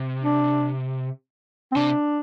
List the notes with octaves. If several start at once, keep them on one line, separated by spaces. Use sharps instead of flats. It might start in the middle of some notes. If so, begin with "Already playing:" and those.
Already playing: C3
D4
C4
C3 D4